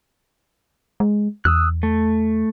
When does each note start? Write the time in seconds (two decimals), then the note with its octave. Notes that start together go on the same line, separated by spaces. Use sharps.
1.00 G#3
1.45 E2 D#6 E6 F#6
1.83 A3